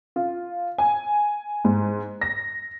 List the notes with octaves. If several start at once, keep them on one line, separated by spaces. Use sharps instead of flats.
F4
G#5
G#2
A#6